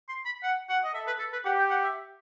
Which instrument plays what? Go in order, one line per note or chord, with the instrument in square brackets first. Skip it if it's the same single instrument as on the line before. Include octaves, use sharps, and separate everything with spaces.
[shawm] C6
B5
F#5
F#5
D#5
[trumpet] A4 [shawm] E5
[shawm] B4
A4
B4
[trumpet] G4 [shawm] F#5
[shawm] G5
F#5
E5